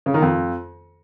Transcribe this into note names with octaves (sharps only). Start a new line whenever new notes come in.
C#3
D#3
F2